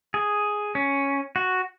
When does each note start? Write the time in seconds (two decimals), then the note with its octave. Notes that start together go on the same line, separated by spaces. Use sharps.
0.14 G#4
0.75 C#4
1.36 F#4